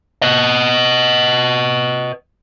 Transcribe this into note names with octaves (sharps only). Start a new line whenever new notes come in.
B4 D#5